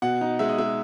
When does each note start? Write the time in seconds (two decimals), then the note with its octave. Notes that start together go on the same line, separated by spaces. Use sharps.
0.02 B2 F#5
0.21 D#4
0.39 G#3 E5
0.49 D#5
0.58 G#3 E5